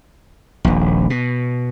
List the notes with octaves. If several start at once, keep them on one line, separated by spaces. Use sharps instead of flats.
D#1 A#1
B2